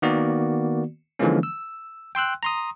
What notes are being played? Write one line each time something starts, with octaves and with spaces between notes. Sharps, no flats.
D#3 A#3 B3 F#4 D5
D3 E3 F3 G#3 A#3 C#4
E6
G5 C6 E6 F#6
A#5 C6 D#6